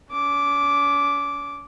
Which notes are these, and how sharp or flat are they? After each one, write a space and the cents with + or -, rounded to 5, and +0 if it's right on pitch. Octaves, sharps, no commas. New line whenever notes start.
C#4 +40 D6 -5